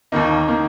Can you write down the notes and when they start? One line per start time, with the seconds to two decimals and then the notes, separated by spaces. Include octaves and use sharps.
0.12 D#2 D#3 A#3 D#4
0.48 D#3 A#3